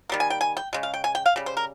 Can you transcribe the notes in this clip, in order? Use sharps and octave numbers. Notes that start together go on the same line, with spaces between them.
D#3 G3 A#3
G#5
G5
G#5
G5
C#3 G#3
F5
G5
G#5
G5
F5
C#3 G3
C5
A#4